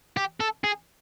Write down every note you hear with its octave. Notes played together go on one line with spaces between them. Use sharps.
G4
A4
G#4